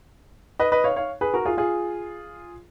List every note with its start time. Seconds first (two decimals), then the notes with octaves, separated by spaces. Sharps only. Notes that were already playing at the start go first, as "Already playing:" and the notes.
0.59 B4 D#5
0.72 B4 D#5
0.84 C#5 F5
0.96 C#5 F5
1.21 G#4 B4
1.34 F#4 A#4
1.45 F4 G#4
1.58 F4 G#4